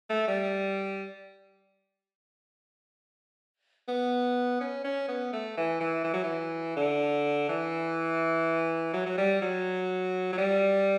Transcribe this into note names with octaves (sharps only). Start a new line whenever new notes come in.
A3
G3
B3
C#4
C#4
B3
A3
E3
E3
E3
F#3
E3
D3
E3
F#3
F#3
G3
F#3
F#3
G3